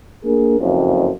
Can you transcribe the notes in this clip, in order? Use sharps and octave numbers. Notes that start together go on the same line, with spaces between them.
A#3 D4 G#4 A#4
F#1 F2